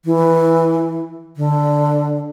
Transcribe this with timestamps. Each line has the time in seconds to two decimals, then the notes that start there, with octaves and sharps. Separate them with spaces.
0.05 E3
1.37 D3